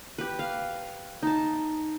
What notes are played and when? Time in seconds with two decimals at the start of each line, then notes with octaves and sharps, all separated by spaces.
0.18 G4 B4
0.39 F5
1.22 D#4 A5